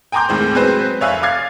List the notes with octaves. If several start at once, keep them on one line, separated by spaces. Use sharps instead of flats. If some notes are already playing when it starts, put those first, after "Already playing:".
G5 G#5 A#5 C6 D6 G6
D#2 A2 G#3 C4
F#3 G#3 C4 B4 C5
F1 C#5 E5 F5 G#5 F#6
F5 D6 F6 G#6 A6 C7